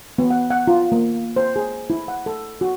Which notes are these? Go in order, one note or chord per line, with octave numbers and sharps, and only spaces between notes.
B3
F#5
F#5
F4
A#3
C5
G#4
E4
F#5
A4
F#4